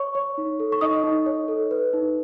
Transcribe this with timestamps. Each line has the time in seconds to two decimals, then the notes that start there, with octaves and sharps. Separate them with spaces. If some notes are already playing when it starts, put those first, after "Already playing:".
Already playing: C#5 C#6
0.15 C#5
0.38 D#4
0.60 A4
0.72 C#6
0.81 D#4 D#5 D#6
1.04 D#4
1.26 C#5
1.48 A4
1.71 B4
1.93 D#4